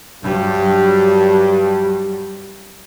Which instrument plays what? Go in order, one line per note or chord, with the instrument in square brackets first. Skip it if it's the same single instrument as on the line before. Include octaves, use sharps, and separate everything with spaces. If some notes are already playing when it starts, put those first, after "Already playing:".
[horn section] G2 [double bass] F#3 G3